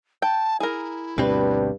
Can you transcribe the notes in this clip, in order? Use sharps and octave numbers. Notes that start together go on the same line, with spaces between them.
G5 A5
E4 G#4 A#4
D2 G2 B2 C4 B4